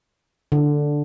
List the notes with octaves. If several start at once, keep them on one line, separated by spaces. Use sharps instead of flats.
D3